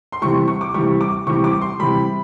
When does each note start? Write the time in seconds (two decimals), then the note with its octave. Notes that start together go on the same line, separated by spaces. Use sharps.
0.12 C6
0.22 C3 E3 G3 C#6
0.48 C#6
0.61 D6
0.74 C3 E3 G3 C#6
1.01 D6
1.27 C3 E3 G3 C#6
1.44 D6
1.61 C6
1.79 C3 E3 G3 B5